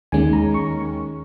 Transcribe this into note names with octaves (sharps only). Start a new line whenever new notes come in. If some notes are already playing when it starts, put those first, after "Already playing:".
D#2 D#3 G#3 C#4 G#5
A#5
C#6